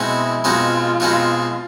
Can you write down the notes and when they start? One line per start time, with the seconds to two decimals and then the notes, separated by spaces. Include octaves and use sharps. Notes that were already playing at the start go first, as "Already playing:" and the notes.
Already playing: B2 G#3 C4 D#4 E4 F#4
0.44 B2 G#3 C4 D#4 F4 F#4
1.00 B2 G#3 C4 D#4 F#4